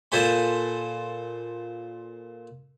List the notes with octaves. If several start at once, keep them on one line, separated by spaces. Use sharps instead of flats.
A#2 A4 C5 G#5 B5